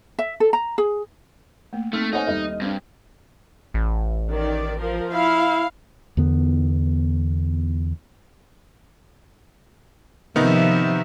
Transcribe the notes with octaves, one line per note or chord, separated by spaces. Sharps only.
E5
A4
A#5
G#4
A3 A#3
A3 A#3 C4 D#4 F6
D#4 A4 C5 C#5 F#5 G#5
D#2 G3 A4 D#5 E5
G2 C4 D4
A1
D#3 D5
F3 A#4
E4 F5
E2 D3 B3
C3 D#3 F3 B3 D#4 E5